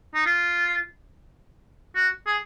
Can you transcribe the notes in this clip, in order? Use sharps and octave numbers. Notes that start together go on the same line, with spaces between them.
D#4
F4
F#4
G#4